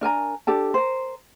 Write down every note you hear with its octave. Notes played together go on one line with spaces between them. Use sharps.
D4 A#4 G#5 A#5
D4 G4 A4 A5
A#4 C5